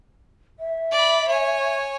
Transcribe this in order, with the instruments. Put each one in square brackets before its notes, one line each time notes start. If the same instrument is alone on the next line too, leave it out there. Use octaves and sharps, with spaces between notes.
[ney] E5
[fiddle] D5 B5
C#5 G#5